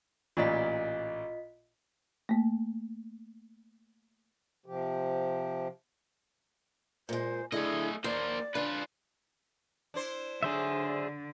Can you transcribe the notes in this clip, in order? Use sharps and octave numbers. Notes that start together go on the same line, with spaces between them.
A1 A#2 F4 D5 D#5 B6
A3 A#3
C3 F3 G4
A#2 G#3 C5
A2 D3 A3 E4 G#4 D#5
D#2 A#3 C5 D5
D4 F4 B4
D4 E4 C5
G#2 D3 F#3 D4 G#4 C5 E5